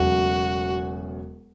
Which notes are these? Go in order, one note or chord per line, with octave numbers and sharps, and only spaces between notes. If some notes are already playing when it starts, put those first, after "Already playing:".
Already playing: E1 E2 C#3 F#3 A3 F#4